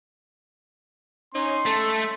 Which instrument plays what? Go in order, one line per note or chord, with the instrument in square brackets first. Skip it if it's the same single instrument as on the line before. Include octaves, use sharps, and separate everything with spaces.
[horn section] C#4 D#4 [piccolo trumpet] C6
[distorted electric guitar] A3 [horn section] A4